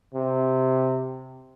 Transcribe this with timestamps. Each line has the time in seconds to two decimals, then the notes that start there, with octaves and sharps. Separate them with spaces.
0.14 C3